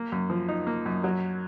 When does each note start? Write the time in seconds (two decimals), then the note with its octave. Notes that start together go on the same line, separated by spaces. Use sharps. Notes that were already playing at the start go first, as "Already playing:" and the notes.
Already playing: A#3
0.12 F#2
0.30 F3
0.48 D#4
0.67 A#3
0.86 F#2
1.04 F#3